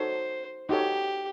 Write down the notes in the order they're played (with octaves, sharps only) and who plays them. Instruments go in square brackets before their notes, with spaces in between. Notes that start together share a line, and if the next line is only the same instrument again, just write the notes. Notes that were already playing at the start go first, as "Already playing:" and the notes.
Already playing: [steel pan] D#4 F#4 A4 C#5 [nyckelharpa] C5
[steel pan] D#4 F#4 A4 C#5 [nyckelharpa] G4